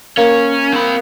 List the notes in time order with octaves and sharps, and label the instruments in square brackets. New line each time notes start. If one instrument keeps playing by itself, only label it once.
[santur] A#3 [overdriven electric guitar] C#4
[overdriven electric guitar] C4 B5